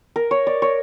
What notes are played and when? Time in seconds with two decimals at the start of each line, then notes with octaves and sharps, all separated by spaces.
0.16 A#4
0.31 C#5
0.47 D5
0.62 C#5